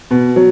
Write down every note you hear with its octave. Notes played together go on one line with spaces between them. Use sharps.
B2
F#3